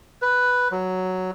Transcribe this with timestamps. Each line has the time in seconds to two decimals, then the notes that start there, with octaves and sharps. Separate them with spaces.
0.22 B4
0.71 F#3